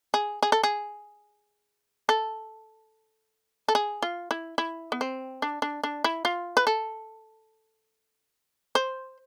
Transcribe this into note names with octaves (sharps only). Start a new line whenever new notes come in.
G#4
G#4
A4
G#4
A4
A4
G#4
F4
E4
E4
B3
C4
D4
D4
D4
E4
F4
B4
A4
C5